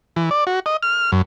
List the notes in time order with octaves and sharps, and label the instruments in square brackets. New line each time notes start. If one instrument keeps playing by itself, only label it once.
[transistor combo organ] E3
D5
F#4
D#5
F6
F#2